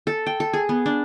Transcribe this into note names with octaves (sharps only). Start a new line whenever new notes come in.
A4
G5
A4
G#4
B3
D4